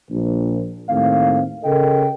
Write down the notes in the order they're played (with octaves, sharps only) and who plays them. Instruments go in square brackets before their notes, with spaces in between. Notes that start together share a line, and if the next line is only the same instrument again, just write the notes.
[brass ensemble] A#1
D#2 A2 C4 F5
C#3 A4 A#4 D#5 G5